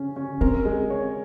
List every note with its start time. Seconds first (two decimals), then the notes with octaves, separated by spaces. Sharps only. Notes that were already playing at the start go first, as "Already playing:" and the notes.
Already playing: C#3 C#4
0.16 C#4
0.41 C4 A#4
0.65 G#3
0.90 C#5